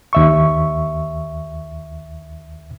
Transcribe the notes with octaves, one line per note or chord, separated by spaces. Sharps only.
D#2 E5 C#6